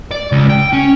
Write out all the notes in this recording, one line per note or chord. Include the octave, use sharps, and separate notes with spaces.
D5
C#2
G5
C#4